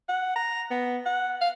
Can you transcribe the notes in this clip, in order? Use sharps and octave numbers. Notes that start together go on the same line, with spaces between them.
F#5
A#5
B3
F#5
F5